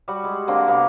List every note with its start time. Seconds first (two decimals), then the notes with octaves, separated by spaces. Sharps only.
0.08 G3 F#4 F#5
0.24 G#3
0.48 D3 A#3 C4
0.67 C3 A#3 B3